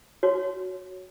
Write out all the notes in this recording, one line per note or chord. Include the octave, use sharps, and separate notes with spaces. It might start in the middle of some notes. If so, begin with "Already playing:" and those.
F#4 C#5